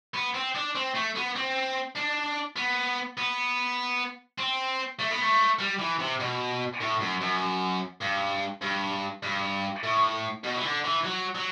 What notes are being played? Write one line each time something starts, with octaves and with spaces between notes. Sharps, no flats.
B3
C4
D4
C4
A3
B3
C4
D4
B3
B3
C4
A3
B3
A3
G3
E3
C3
B2
A2
F#2
F#2
G2
G2
G2
A2
B2
E3
D3
E3
F#3
F#3